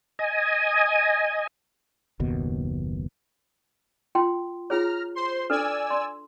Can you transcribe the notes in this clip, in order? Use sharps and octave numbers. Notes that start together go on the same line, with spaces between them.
D#5 G#5
F#1 D#2 B2
F4 G5 C6
F4 G#4 C#5 A#5 F6
C5 C6
D4 A4 B4 D5 G#5 E6
C6